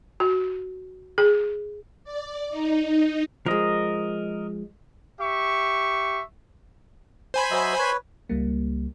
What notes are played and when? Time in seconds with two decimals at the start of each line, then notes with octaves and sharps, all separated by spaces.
0.20 F#4
1.18 G#4
2.04 D5
2.50 D#4
3.46 F3 G#3 A#4 D#5
5.21 G4 E5 C#6
7.34 C5 G#5 B5
7.51 F#3 D#5 E5
7.79 B4 C#5
8.29 C#2 G3 A#3